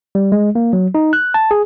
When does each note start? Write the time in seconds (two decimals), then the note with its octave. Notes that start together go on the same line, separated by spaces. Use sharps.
0.15 G3
0.32 G#3
0.55 A#3
0.73 F#3
0.95 D#4
1.13 F#6
1.34 A5
1.51 G#4